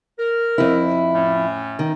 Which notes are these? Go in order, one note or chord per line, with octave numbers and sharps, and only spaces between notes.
A#4
F2 E4
A2 A3 C#4
D#3